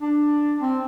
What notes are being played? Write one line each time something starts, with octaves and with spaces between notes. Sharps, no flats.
D4
C4